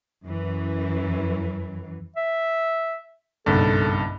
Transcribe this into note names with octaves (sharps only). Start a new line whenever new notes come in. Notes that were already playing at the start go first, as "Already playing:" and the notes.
F#2 E3
E5
F#1 B1 G2 A4